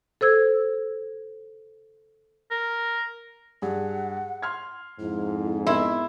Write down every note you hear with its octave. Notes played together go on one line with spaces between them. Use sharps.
A4 C5 E6 G#6
A#4
G2 G#4 F#5
C6 F6 G#6
F2 G#2 E4
B3 E4 A#4 D#5 C6